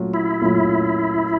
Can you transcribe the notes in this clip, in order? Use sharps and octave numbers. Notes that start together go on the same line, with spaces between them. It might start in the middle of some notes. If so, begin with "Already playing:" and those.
Already playing: A#2 F#3 A3 C#4 F4
E4
A#2 F#3 A3 C#4 F4